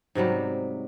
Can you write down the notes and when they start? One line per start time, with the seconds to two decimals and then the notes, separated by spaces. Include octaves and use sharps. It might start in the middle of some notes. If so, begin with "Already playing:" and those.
0.15 G#2 C3 F#3 G3